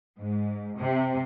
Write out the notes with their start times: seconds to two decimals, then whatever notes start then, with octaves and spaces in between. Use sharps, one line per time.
0.18 G#2
0.77 C3